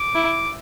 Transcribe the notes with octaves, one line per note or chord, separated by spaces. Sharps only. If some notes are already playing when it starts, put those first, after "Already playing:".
Already playing: D6
E4